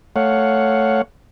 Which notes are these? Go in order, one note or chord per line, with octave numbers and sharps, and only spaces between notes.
A3 C#5 F5 F#5